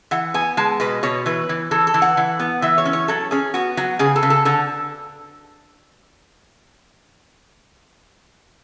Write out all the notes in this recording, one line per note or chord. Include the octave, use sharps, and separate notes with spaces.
E3 F#5
B3 G#5
G#3 A5
B2 B4
B2 C#5
E3 B4
E3
E3 A4
A4
E3
F#5
E3
B3
E3 E5
C#5
C#4
C#5
F#3 A4
C#4 G#4
B3 F#4
F#3 F#4
C#3 G#4
A4
C#3
A4
D3 A4